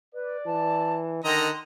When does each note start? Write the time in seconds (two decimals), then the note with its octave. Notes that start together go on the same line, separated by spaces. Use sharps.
0.14 B4 D5
0.46 E3 A5
1.24 D3 D#3 D#5 A#5 C6